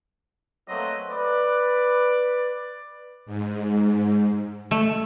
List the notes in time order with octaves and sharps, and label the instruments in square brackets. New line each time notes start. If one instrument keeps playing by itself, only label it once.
[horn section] F#3 A3 A#3 C4 B4 D#5
B4 D5
[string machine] G#2
[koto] A3